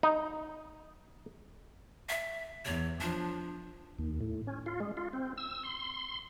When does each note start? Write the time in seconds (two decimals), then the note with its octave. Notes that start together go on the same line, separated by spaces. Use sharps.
0.03 D#4
2.09 E5
2.65 E2 C#5
3.00 F3 D4
3.99 D#2
4.21 A2
4.47 C#4
4.66 F4
4.80 G#3
4.97 F4
5.13 C4
5.37 E6
5.63 C6